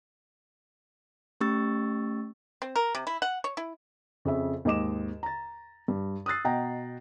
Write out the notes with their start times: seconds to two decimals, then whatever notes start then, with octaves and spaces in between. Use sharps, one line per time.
1.41 A3 C#4 G4 C#6 E6 A6
2.62 C4
2.76 A#4
2.95 C3
3.07 E4
3.22 F#5
3.44 C#5
3.57 E4
4.25 F2 C#3 E5
4.65 D#2 G#2 D#5 D6 E7
5.23 A#5 A6
5.88 G2
6.26 D#6 E6 F#6 A6 C7
6.44 B2 D#5 F#5 G5 A#5 A#6